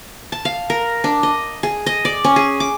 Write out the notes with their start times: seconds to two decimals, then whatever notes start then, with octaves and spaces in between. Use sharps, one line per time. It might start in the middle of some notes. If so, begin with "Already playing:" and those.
0.32 A5
0.45 F5
0.70 A#4
1.04 D4
1.23 D#5
1.63 G#4
1.86 D#5
2.05 D5
2.24 C#4
2.36 G#4
2.60 D6